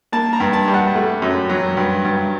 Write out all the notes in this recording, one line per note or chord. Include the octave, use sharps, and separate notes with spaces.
A#3 A5
A#5
G2
A5
G3
F#5
A3
F#2
F#3
G2
G2